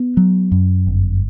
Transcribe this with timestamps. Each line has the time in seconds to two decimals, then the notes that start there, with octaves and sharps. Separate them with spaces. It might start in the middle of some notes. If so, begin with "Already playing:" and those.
Already playing: B3
0.17 F#3
0.52 F#2
0.87 G1